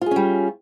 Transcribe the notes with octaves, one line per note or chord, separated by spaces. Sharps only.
G3 C#4 F4 G#4